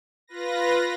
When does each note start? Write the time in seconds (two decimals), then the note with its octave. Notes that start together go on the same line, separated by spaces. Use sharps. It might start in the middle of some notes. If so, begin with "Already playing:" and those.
0.27 F4 B4 A#6